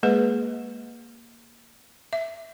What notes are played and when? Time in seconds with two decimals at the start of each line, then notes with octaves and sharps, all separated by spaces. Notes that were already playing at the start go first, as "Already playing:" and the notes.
0.03 G#3 A#3 G#4 B4
2.13 E5